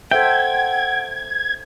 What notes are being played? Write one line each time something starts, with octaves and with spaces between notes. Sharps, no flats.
A4 C5 E5 F#5 G5 G#6